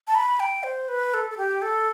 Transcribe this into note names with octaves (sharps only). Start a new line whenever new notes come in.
A5
B5
G5
C5
B4
A4
A4
G4
A4